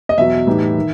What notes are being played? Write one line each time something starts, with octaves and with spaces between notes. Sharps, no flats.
D#5
E2 B2 F#3 E5
A2 E3 G3 D#4
D#3